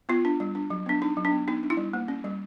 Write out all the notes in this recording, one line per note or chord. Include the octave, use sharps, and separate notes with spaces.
B3 F4
D4
G3
D4
F#3
B3 D4
D4 D#4
F#3
D4
B3
B3 D#4
D4
E4
G3
A#3
C#4
G3